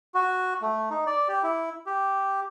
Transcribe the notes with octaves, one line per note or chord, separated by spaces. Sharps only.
F#4
A3
D#4
D5
G4
E4
G4